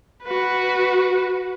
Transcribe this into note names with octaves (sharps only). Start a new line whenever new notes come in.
F#4 B4